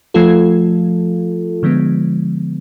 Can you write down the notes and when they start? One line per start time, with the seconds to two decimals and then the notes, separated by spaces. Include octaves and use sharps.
0.14 F3 A3 F4 A4
1.63 D3 F3 G#3 B3